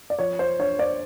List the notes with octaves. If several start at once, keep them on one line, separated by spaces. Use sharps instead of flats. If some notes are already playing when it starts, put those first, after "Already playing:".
D5
F3 C#5
C5
D4 C#5
C5 D5